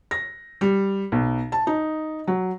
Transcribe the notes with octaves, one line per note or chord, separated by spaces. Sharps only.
A#6
G3
B1
A5
D#4
F#3